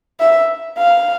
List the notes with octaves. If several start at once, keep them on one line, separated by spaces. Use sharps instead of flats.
E5
F5